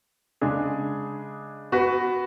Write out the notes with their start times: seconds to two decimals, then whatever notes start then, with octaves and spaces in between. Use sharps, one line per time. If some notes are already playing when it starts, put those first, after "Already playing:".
0.41 C#3 G#3 D4 G#4
1.72 B3 F#4 B4